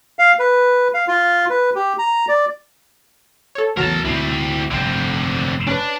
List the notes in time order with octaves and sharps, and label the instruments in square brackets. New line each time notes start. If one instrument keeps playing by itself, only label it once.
[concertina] F5
B4
F5
F4
B4
G4
A#5
D5
[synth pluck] A4 C#5
[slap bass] E2 C#3 E3 [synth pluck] F#3 [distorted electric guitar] A#4 A5
[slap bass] D2 A#2 [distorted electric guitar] C4 E4
[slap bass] F1 G2 [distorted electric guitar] D3 C4
[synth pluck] C#4 B4 [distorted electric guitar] D4